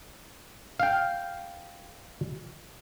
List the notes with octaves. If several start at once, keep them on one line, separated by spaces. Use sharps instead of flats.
F5 G5